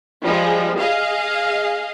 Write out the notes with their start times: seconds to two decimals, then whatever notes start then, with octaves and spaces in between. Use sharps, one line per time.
0.25 F3 G3 G#3
0.78 G#4 D#5 F5